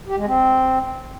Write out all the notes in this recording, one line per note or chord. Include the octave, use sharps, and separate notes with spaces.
G4
G#3
C4